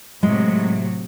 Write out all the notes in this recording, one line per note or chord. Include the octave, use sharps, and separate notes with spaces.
A2 C3 F#3 G#3